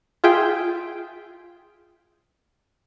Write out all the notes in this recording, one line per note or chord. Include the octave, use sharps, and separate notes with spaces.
F4 G#4 E5 G5